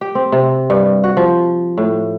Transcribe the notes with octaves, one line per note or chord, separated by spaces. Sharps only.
G4
C4
C3
G2
F#4
F3
A2